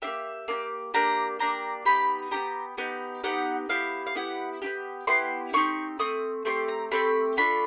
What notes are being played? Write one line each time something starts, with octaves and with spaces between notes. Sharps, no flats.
A#3 D4 G4 E5
A#3 D4 G4
A#3 D4 G4 A#5
A#3 D4 G4 A#5
B3 D#4 G4 B5
B3 D#4 G4 A#5
B3 D#4 G4
B3 D#4 G4 F#5
B3 E4 G4 F5
F5
B3 E4 G4 F#5
B3 E4 G4
B3 E4 G4 C6
A3 C4 D#4 G4 C#6
A3 C4 D#6
A3 C4 G4 C6
A#5
A3 C4 G4 B5
A3 D4 F4 B5